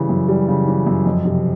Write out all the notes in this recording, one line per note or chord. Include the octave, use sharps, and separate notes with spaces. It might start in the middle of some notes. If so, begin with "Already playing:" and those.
Already playing: C#3 E3 G3
F#2
G3
C#3
E3
F#2
F2
C3